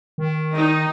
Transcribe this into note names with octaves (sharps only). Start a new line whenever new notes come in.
D#3
D#4